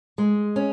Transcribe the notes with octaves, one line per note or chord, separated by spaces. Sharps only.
G#3
C#4